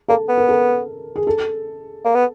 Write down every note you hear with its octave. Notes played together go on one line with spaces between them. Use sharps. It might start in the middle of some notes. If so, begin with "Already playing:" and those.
A#3 A4
B3
A#4
A4
G#4
A4
A#3
B3